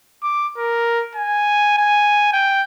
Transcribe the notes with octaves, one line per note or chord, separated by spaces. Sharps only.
D6
A#4
G#5
G#5
G5